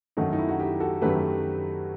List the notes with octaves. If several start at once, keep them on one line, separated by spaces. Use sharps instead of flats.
F#2 D#3 F#3 A3 D#4 F#4
D#4
E4
F#4
E4 G4
F#4 A4
F#2 D#3 F#3 A3 G4 B4